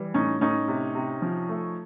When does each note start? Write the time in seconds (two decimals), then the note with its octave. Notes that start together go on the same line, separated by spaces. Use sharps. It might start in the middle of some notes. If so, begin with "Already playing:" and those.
Already playing: E3 G3
0.14 A2 C#4 D#4
0.41 A2 C#4 D#4
0.68 C3
0.95 C3
1.22 F3
1.49 A3